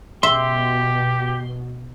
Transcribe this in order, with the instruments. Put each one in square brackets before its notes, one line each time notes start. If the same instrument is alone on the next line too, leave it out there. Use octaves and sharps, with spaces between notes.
[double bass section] B2 [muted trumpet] G4 [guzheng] E5 [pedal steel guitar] C6